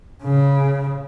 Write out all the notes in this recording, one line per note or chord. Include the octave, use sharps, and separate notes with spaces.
C#3